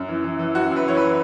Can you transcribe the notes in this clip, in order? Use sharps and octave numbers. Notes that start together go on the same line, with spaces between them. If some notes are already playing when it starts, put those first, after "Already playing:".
Already playing: F#2
E3
E3
E3
F#2 F#4
F#2
B4
E3 C#5
B4